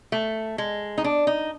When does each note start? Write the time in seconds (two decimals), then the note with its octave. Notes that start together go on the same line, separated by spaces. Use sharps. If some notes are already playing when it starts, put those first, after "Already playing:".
0.12 A3
0.58 G#3
0.98 D#4
1.04 D4
1.27 D#4